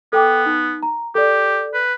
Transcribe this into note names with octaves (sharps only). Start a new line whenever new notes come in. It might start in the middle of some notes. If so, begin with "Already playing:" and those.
B3 A4 G5 D6
D#4
A#5
G4 A4 D5
B4